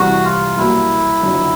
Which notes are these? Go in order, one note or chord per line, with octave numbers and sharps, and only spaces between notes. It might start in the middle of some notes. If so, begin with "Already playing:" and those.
Already playing: C2 C3 E3 G3 F#4
F4
C2 B2 F#3 A#3 E4
F#1 F2 D3 F#3